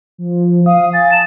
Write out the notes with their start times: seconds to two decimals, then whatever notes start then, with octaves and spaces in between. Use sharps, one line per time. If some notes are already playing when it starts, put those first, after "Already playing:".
0.18 F3
0.66 F5 D#6
0.93 G#5 A6
1.12 A5 E7